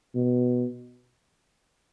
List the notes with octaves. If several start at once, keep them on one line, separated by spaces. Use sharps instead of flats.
B2